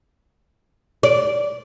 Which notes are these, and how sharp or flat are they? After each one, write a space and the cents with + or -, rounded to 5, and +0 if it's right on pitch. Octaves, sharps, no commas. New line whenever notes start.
D5 -15